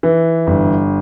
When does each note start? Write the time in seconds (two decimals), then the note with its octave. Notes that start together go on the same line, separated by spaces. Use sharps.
0.03 E3
0.47 G1